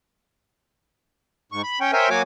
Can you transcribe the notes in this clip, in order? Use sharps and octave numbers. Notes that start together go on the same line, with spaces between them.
G#2 C#6
B5
C#4 C#5 G5
A#4 C5 C#5 E5 G5 G#5
F#3 A#3 F#4 C#5 G#5 D6